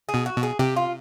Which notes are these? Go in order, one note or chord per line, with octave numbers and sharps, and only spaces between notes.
G#4
B2
F#4
B2
G#4
C3 G4
F4